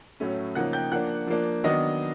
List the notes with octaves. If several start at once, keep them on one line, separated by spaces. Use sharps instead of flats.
A2 F#3 A3 C#4
C#3 F3 A#3 D#4 F#5 F#6
G5 G6
F3 A#3 D4 F#5 F#6
F3 A#3 D4
D#3 F#3 B3 D4 D#5 D#6